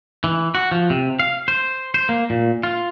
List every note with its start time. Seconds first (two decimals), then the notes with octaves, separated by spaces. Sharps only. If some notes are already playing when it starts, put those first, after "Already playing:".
0.24 E3
0.55 F#4
0.71 F3
0.90 C3
1.20 F5
1.48 C5
1.94 C5
2.09 A#3
2.30 A#2
2.63 F4